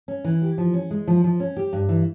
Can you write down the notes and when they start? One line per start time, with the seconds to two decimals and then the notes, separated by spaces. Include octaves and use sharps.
0.08 C#4
0.24 E3
0.42 G4
0.58 F3
0.74 C#4
0.91 G#3
1.08 F3
1.24 F3
1.40 C#4
1.57 G4
1.73 G2
1.89 E3